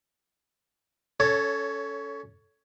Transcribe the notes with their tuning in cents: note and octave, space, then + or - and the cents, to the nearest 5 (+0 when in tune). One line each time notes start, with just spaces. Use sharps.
C#4 +20 A4 +0 C#5 +0